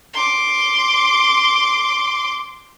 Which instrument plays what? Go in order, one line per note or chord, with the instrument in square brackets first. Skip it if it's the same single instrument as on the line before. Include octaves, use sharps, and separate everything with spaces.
[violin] C6 D6